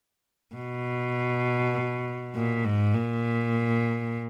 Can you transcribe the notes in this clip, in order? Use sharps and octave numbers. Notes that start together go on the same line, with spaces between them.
B2
A#2
G#2
A#2